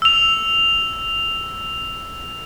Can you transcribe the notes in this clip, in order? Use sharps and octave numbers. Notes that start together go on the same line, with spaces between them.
E6 F7